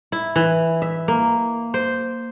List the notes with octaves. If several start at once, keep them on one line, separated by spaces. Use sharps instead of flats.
E4
E3
E5
A#3
C5